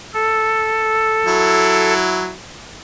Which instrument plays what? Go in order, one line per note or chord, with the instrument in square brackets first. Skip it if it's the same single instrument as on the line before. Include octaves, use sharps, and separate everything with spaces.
[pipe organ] A4
[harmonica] F#3 E4